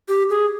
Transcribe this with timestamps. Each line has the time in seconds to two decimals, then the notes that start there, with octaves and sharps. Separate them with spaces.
0.08 G4
0.30 G#4